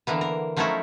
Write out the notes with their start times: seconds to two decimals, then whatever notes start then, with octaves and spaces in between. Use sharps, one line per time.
0.07 D3 E3 A#3 B3
0.21 A#4
0.57 F3 F#3 A3 C#4 D#4 E4